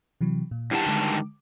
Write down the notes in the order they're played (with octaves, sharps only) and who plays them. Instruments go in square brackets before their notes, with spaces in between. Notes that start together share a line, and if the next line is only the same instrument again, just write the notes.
[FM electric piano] C3 E3 F#3
A#2
[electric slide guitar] G2 D#3 A5 [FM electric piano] E4 G4 F#5
[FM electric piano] D3 G#3 D6